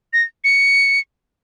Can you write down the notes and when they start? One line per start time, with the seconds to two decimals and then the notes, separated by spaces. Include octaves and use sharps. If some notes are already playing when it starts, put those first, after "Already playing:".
0.13 A#6
0.44 C#7